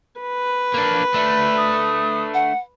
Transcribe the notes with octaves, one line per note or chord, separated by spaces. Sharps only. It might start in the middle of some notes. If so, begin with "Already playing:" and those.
B4
A#3 D4
A3 D4
D#6
F#5